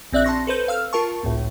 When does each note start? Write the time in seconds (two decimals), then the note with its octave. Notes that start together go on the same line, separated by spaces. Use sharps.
0.13 A#1 C4 D5 E5 F#6
0.24 A5 C6 C#6 A#6
0.47 A4 B4 C5 G6
0.68 F5 E6 F6
0.93 F4 A#4 A5 C#6
1.23 G#1 C#2 A2